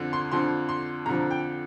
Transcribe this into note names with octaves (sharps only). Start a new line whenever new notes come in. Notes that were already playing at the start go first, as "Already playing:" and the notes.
Already playing: F2 D3 F3
C6
F2 D3 F3 C6
C6
F2 D3 F3 A#5
G5